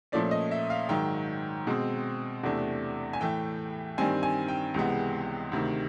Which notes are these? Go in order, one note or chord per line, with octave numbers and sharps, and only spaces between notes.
A#2 F3 A3 C#4 D5
D#5
E5
F5
G#2 D#3 F#3 G5
B2 G#3 C4
E2 C3 E3 A3 D4
G#5
A2 E3 A3 G5
G2 D#3 G3 C4 G#5
G#5
G5
C#2 C3 E3 G#3 B3
D2 C3 D#3